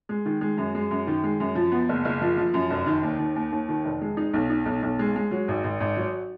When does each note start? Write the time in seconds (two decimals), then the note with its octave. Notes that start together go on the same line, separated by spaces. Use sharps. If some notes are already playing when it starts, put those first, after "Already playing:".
0.09 G#3
0.25 D#3
0.41 G#3
0.57 F#2
0.75 G#3
0.91 F#2
1.07 D#3
1.24 G#3
1.40 F#2
1.55 F3
1.72 B3
1.89 F#1
2.05 F#1
2.21 F3
2.38 F3
2.54 F#2
2.70 F1
2.86 D#3
3.03 D#2
3.19 D#3
3.36 D#2
3.52 D#2
3.68 D#3
3.85 F1
4.01 G#3
4.17 D#4
4.33 B1
4.50 D#4
4.66 B1
4.83 B1
4.99 G#3
5.16 G#3
5.31 F#3
5.48 G#1
5.64 G#1
5.80 G#1
5.97 F#3